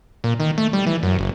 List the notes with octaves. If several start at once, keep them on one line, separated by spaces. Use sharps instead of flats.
A#2
D#3
A3
G3
E3
F#2
F#1